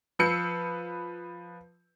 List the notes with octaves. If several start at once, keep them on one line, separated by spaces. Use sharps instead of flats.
F3 B4 E6 G6 C7 C#7